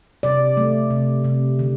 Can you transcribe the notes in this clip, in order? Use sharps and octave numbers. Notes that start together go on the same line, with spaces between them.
C3 D5
A3
C3
C3
D3